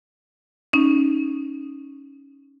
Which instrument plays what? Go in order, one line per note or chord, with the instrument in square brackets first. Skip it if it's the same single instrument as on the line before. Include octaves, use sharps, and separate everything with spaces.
[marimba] C#4 D#4